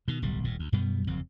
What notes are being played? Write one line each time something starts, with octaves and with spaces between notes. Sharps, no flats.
B2 D#3
D1 B1 G3
D#1 A2
D2
F#2 B2 G3 B3
F#1 F2 C4